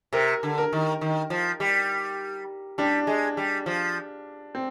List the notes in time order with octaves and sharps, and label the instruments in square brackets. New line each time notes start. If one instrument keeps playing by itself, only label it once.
[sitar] C3 [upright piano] A#4
[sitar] D3
[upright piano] A#4
[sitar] D#3
D#3
F3
G3
[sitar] G3 [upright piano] D4
[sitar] G#3
G3
F3
[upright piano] C4